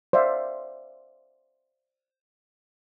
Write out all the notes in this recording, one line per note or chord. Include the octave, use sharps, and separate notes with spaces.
C5 D5 E5 F5